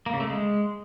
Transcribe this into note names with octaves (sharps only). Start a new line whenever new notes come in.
A#3
C#3
A3
G#3